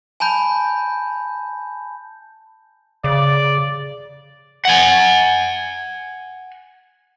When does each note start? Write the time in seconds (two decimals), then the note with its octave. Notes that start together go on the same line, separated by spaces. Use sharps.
0.20 G#5 A5 B5 G6
3.04 C#3 D5
4.65 F#5 G#5